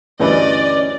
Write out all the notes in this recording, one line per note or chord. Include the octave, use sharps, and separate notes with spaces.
D2 G2 E3 C#4 D5 D#5